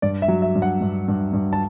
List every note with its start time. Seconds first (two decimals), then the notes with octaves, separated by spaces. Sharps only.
0.02 G2 D5
0.22 E5
0.28 F#3
0.42 E5
0.55 G2
0.62 F#5
0.81 G2
1.08 G2
1.33 G2
1.53 A5